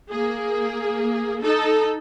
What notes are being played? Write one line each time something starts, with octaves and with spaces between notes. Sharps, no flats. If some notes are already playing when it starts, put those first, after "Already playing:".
A#3 G#4
D#4 A4